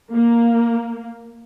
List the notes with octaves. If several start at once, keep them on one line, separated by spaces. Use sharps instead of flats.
A#3